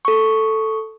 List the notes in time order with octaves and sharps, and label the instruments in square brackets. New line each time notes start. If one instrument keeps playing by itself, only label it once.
[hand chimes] A4 C#6